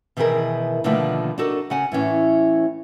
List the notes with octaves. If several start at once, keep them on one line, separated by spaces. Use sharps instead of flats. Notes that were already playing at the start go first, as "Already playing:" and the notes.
B2 D#3 E3 E4 G#4 A#4
B2 D3 D#3 F3 A3 A#3
D4 D#4 F#4 A4 A#4
C#3 C#4 F#5 G#5
A2 E3 C#4